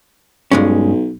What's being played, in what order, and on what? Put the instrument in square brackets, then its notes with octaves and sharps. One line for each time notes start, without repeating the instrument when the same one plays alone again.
[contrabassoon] B1 [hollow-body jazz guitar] G2 G#3 C#4